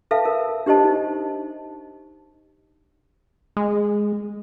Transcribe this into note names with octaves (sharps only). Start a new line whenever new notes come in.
A4 B4 E5 F5 A5
A#4
D4 G4 C5 D#5 A5
D#4
G#3